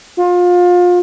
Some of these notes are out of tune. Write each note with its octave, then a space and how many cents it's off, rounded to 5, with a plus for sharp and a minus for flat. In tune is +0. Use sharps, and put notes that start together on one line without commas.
F4 +30